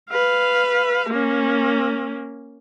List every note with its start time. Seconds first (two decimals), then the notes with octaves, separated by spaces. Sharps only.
0.10 B4 F5
1.10 A#3 C#4